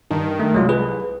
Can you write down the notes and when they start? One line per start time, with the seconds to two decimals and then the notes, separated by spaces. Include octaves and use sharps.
0.11 G2 D#3
0.40 A3
0.54 C2 F#3 G#3 F4
0.69 G#4 B4